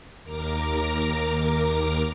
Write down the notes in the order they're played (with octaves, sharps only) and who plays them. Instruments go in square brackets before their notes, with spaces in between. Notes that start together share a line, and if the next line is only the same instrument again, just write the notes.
[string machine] D#2 A#4 A#5 D6